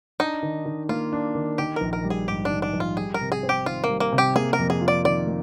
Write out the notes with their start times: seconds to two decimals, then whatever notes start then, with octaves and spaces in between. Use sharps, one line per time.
0.20 D4 D#4
0.43 D#3
0.66 D#3
0.89 A#3 F4
1.13 D4
1.35 D#3
1.58 D#3 G4
1.76 A#1 A#4
1.93 A#4
2.04 G3
2.10 G#4
2.28 G#2 G4
2.45 D4
2.50 D#3
2.62 D4
2.73 A#1
2.80 F4
2.97 G3 G#4
3.14 A#4
3.21 C3
3.32 G#4
3.43 C4
3.49 G4
3.66 D#3 F4
3.84 A#3
3.89 G3
4.00 A#3
4.12 C3
4.18 G4
4.36 A#3 G#4
4.53 A#4
4.59 F2
4.70 G#4
4.81 F4
4.88 D5
5.05 D#3 D5
5.27 A#3